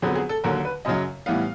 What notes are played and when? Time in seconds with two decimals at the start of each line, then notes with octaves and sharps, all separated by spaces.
0.02 F2 D3 F#3 B3 G#4
0.15 G#4
0.29 A4
0.44 D#2 D3 F#3 A#4
0.65 B4
0.85 F#2 C#3 F#3 D#5
1.26 A2 E3 G3 B3 F5